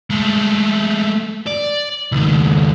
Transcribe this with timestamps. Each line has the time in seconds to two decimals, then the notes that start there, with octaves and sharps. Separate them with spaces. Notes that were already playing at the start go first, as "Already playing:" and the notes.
0.10 G#3 A3
1.47 D5
2.12 C#2 D#3